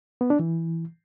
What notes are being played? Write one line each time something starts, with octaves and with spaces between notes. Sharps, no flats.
B3
D4
E3